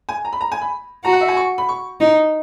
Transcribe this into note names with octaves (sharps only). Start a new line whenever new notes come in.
G#5
A#5
B5
A#5
G#5
B5
F#4 A#5
F#5
E5
G#5
C#6
B5
C#6
D#4